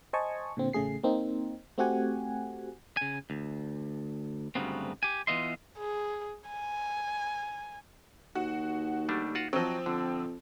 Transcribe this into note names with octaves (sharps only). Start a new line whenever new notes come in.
C5 D#5 G#5 A5 C#6
A#2 D3 C4
A1 C#3 A3 G#4 C7
A#3 C4 D#4
A3 C4 F#4 G4 F#5 G#5
C#3 G#5
D2
D2 G2 C#3 F#3 B3 C4
G4 G#5
E3 B3 F4 D#5 E5 C6
G#4
G#5
D#2 F#4
G3 A3 D4
F4 F#4 F#5
F3 F#3 C4 D#5
F2 D3